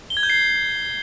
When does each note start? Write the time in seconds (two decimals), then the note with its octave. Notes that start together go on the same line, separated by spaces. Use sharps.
0.10 G7
0.17 G#6
0.23 G6
0.30 C7